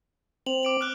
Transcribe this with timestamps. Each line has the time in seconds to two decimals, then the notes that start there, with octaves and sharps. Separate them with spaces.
0.46 C4 F7 F#7
0.63 D6 D7 F#7
0.81 F6 F#6